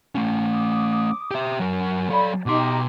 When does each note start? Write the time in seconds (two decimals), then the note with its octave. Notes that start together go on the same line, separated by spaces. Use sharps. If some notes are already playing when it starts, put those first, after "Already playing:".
0.15 A3 C#4
0.49 D6 D#6
1.31 G4 E5
1.60 F#3 A#4
2.09 F#3 A4 C#5 D5 B5
2.46 B2 D#4 G4 C6 D6